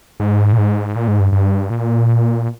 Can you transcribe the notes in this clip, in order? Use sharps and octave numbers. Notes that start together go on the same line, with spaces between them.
G#2
A#2
G#2
A#2
G#2
G2
G2
A#2